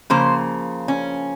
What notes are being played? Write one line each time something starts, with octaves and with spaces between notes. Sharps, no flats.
C#3 F3 A#3 C5
C#4